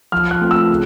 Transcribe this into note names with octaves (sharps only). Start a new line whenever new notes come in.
F3 F6
F#6
A3 C4 F4
E6
C#3